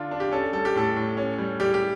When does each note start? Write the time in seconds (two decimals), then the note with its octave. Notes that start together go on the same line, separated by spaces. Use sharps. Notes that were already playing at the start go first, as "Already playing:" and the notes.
Already playing: D3 D4 F4
0.11 D4
0.20 G4
0.32 C#4 A4
0.53 G3 A4
0.65 G4
0.75 A2 A4
0.96 A2
1.17 C#4
1.39 G3
1.60 G3 G4
1.74 G4